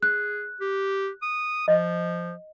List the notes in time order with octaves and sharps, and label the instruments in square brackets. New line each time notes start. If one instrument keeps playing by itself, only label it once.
[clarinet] G#4 [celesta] F#6
[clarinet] G4
D#6
[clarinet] F3 [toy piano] D#5